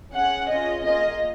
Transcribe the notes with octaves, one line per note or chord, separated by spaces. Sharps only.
C#4 G#4 F#5
C#4 F4 G#4 D#5
A#3 F4 G#4 D#5